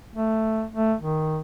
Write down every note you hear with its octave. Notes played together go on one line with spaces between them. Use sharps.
A3
A3
D#3